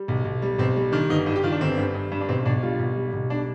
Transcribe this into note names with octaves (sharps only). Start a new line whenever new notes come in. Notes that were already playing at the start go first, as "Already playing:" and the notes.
Already playing: G3
B1
B1
G3
B1 C4
G3
D#3 D4
G1 D#4
G2 D#4
G4
D#3 F4
D4
G1 C4
G2
G2
G2
D4
B1 C4
B1 D4
G3 F4
B1
G3
B1
G3 D4